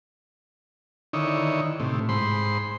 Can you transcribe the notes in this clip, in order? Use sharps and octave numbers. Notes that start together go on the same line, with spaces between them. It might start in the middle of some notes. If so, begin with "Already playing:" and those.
D3 D#3 D#4 E4 C#5
A2 C3
G#2 C5 B5 C6